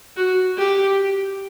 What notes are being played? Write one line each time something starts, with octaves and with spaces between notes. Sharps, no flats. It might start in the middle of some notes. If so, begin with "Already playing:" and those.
F#4
G4